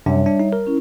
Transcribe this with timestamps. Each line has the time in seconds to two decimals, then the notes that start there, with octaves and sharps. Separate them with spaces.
0.06 F#2 C3 G3 D4 C#5 E5
0.26 D4
0.40 D#4
0.53 A#4
0.67 C#4 E4